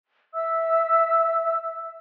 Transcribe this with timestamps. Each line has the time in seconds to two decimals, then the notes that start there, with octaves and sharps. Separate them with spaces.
0.34 E5 E6